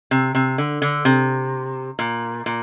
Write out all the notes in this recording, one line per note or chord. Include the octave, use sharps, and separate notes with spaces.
C3
C3
D3
D3
C3
A#2
A#2